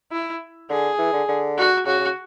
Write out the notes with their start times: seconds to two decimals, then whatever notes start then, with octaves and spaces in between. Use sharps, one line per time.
0.12 E4
0.70 D3 G#4
0.98 E3
1.13 D3
1.28 D3
1.57 F#4
1.86 C#3 F#4
1.99 C#3